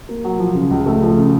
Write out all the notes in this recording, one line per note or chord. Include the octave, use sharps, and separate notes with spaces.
A#3
F#3
F3
C#3
C#2
A3
F3
C#3